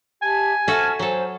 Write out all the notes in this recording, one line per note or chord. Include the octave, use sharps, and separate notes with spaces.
G4 E5 G#5 A5
F#4 A4 C5 E5 A5 F6
F#3 A4 C5 G#5